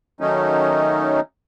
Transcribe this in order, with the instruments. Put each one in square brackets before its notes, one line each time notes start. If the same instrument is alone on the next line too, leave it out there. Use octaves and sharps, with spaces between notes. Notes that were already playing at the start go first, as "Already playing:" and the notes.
[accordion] D#3 F#3 A3 C#4 D#4